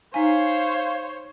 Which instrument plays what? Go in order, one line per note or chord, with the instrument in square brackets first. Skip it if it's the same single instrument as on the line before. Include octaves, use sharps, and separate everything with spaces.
[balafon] D#4 G#5 [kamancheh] C5 C#5 [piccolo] F5